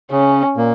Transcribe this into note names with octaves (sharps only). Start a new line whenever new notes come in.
C#3 C#4
A#2 A#3